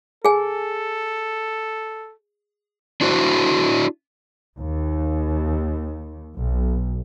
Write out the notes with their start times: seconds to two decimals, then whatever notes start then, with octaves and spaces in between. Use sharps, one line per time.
0.25 G#4 A4 G#5
3.01 D4 E4 F#4 C5 D5
4.58 D#2
6.36 B1